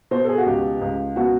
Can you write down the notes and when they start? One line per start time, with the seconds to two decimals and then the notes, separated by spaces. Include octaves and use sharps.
0.11 B2 C5
0.25 A4
0.29 G#4
0.38 F#4
0.46 C#2 G4
0.81 C#2
1.16 B2 F#4